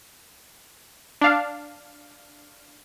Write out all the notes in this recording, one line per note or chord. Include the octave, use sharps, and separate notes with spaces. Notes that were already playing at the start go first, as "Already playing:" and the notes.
D4 F5